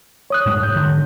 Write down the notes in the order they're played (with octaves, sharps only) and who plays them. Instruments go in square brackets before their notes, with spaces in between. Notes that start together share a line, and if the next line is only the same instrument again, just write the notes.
[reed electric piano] C#5 D#6 F#6
[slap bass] G#2 G3 G#3
[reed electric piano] G6
[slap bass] D3